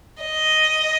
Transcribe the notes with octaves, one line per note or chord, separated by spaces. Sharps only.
D#5